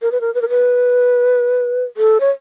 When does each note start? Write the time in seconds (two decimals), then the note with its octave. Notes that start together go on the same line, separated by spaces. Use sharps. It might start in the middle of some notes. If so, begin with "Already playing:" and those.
0.02 A#4
0.12 B4
0.21 A#4
0.34 B4
0.42 A#4
0.49 B4
1.97 A4
2.20 C#5